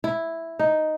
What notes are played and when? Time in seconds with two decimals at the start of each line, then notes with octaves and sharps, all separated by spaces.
0.04 E4
0.59 D#4